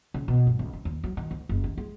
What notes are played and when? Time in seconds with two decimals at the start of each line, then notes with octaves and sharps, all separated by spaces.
0.14 C#3
0.28 B2
0.47 G2
0.59 C#2
0.73 C4
0.85 D#2
1.04 F#3
1.17 D#3
1.31 D2
1.49 F#1
1.64 D#2
1.77 G#3